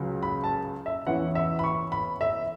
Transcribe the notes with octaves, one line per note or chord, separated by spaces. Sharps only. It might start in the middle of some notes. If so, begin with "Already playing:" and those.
Already playing: C#2 C#3 F#3
B5
A5
E5
E2 E3 C#4 E4 F#5
E5
B5
C#6
B5
E5